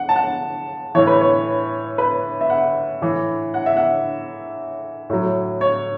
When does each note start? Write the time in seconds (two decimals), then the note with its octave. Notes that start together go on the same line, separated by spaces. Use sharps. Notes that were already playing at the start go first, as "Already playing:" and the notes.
Already playing: F#5
0.09 A5
0.16 F#5
0.95 A2 E3 C#5
1.07 B4
1.21 C#5
1.98 B4
2.41 E5
2.50 F#5
3.01 A2 E3
3.54 F#5
3.66 E5
3.77 F#5
5.10 A2 F#3
5.61 C#5